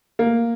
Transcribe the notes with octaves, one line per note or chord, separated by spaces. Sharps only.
A#3